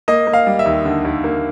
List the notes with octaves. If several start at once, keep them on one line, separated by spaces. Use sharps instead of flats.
A#3 D#5
A#3
F5
G3
E5
D#2
D3
D#2
A#3